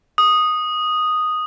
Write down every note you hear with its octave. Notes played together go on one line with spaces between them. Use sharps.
D#6